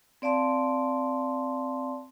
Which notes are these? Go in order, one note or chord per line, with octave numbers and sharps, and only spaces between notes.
C4 D5 F5 A5 C6